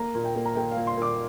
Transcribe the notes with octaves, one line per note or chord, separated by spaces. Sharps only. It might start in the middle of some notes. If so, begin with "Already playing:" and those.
Already playing: A#3 A#5
A#2
G5
A#3
A#5
A#3 G5
F5
A#2
C6
A#2 D6